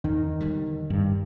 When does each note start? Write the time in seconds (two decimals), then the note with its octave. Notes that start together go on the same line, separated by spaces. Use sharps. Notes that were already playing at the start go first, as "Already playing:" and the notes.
0.04 E2 D#3
0.40 E1 D3 G3
0.90 G2